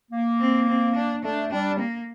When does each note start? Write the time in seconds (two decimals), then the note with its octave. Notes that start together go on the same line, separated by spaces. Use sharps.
0.11 A#3
0.40 C4
0.68 C4
0.95 D4
1.24 A3 D4
1.52 G3 D4
1.79 A#3